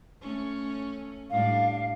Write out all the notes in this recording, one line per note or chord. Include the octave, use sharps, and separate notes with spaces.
A3 C#4
A2 G3 D4 F5